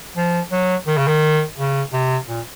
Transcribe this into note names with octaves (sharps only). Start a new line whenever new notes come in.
F3
F#3
D#3
C#3
D#3
C#3
C3
A#2